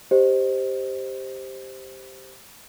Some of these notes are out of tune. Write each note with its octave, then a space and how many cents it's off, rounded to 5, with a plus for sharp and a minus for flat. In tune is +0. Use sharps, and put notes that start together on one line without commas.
G4 +0 C5 +0 D#5 -10